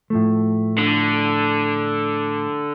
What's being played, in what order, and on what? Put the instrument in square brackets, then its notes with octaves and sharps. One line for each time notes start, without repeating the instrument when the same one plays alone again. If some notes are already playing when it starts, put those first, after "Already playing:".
[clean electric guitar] A2 F3 A3
[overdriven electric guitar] D3